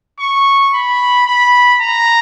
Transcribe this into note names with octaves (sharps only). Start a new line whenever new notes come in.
C#6
B5
B5
A#5